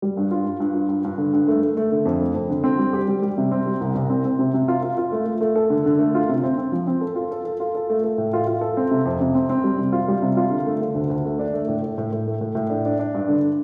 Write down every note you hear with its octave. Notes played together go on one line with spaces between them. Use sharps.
G3
G2
F4
G2
G2
F4
G2
G2
D3
G2
A3
A3
A3
D3
F2
A3
F2
D3
C4
G3
G4
G3
G3
C3
C4
G3
C2
C2
C4
C4
C3
C3
F4
F4
F4
A3
A3
A3
A4
D3
D3
A3
F4
C3
C4
C4
F3
C4
A4
F4
A4
A4
F4
A4
A3
A4
A2
F4
F4
A4
C4
C3
F2
C3
C4
C4
G3
C3
F4
G3
C3
F4
D3
A3
D3
D2
D2
A3
D4
A3
A2
A2
A2
A2
A3
A2
A2
D4
D4
D4
G2
D3